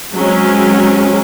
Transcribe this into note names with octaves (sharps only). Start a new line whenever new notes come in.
F#3 G#3 C4 C#4